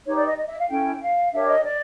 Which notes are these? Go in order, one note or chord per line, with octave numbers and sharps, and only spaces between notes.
D#4 G4 B4 C#5
D5
D#5
D#5
E5
F5
C#4 E4 A4 G5
F5
D4 G4 A#4 C#5 E5
D#5
D5